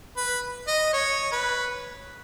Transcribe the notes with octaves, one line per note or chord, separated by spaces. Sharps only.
B4
D#5
C#5
B4